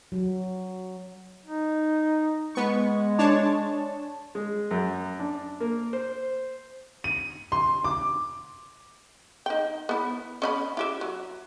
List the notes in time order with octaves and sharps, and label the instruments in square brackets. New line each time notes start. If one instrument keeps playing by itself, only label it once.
[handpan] F#3
[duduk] D#4
[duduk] G#3 [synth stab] B3 C#6
[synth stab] D4 C#5 A5
[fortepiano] G#3
F#2
D4
A#3
C5
[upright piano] D#7
C6
D6
[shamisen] D#4 G5
B3 E4
C#4 D#5 B5
E4 G4 E5
F#3